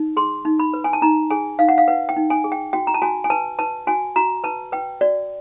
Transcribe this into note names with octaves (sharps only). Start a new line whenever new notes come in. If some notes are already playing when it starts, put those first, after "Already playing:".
Already playing: D#4
G#4 C6
D#4
B5
B4
G#5
A5
D#4 A#5
G#4 G#5
D#4 F5
F#5
F5
B4 F#5
G5
D#4
G#5
G#4
G5
F#4 G5
A#5
A5
F#4 G#5
G#5
B4 A5
B4 A5
F#4 G#5
F#4 A#5
B4 A5
B4 G5
F#4 D5